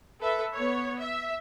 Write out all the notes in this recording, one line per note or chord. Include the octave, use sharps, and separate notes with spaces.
A4 B4 E5
B3 C#5
E5